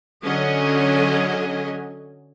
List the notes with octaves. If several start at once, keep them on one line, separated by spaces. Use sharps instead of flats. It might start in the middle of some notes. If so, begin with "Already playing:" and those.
D3 F#3 C#4 D#5 G#5